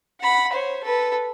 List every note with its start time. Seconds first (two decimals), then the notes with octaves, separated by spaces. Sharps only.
0.21 F#5 B5
0.53 C5 C#5
0.84 A4 B4